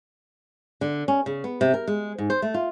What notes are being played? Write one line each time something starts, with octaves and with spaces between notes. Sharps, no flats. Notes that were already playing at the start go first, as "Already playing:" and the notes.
D3
C#4
C#3
B3
C3
A#4
G#3
G#2
C5
A3
F4